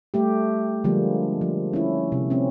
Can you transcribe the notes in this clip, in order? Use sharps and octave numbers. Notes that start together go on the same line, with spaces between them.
G3 A3 G4
D3 F3 G3 G#3 A#3
F3
C#4 E4
C3
C4 C#4